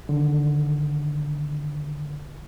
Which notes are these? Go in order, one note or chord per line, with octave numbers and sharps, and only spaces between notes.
D3 D#3